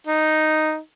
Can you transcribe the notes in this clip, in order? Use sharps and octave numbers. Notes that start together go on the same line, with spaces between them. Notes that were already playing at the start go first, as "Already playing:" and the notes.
D#4